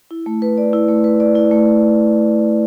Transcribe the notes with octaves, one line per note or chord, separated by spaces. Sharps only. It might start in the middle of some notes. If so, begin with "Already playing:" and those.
E4
A3
B4
D5
E4
A3
B4
D5
E4
A3